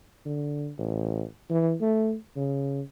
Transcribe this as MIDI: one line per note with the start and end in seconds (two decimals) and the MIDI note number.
0.26 0.71 50
0.78 1.24 33
1.50 1.74 52
1.81 2.16 57
2.36 2.81 49